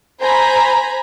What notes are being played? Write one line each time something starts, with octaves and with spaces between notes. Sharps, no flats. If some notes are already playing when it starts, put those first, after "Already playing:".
C5 G#5 A#5 B5